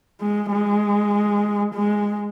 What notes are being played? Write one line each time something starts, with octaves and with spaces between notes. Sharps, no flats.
G#3
G#3
G#3